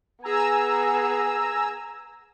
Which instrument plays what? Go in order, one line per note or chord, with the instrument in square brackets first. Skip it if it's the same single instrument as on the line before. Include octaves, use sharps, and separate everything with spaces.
[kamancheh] B3 G#4 [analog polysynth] G#5 A#5 E6